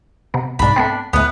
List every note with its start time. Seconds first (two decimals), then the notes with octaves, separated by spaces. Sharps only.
0.34 C3 B3
0.59 C2 G#2 D4 B5
0.76 A3 B3 C4
1.13 D2 A2 B3 B4